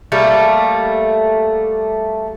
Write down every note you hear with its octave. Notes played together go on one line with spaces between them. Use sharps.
G3 A3 A#3